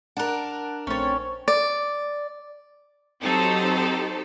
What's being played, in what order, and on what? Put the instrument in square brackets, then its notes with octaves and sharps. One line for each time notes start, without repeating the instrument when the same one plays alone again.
[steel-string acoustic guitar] D4 A#4 [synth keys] F#5 A5 F#6
[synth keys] A#1 A3 A6 [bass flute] C4 [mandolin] C#4 C#5
[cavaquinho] D5
[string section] F#3 C4 D#4 G4 A4 C5